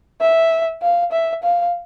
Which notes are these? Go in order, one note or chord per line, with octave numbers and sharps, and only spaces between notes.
E5
F5
E5
F5